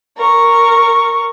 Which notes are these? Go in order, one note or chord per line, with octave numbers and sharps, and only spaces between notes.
A#4 C#6